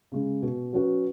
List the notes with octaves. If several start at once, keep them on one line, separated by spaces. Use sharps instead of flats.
C#3 G#3
B2
F#3 C#4 F#4 B4